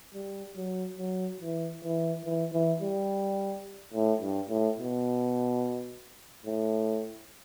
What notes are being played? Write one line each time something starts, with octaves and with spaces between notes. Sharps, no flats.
G3
F#3
F#3
E3
E3
E3
E3
G3
A2
G2
A2
B2
A2